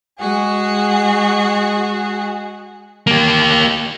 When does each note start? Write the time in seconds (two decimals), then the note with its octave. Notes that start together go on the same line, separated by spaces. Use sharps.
0.19 G#3 F#4 G#4
3.07 A#3 G4